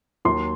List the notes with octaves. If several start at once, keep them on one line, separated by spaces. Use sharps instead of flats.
D#2 D#3 F#3 C6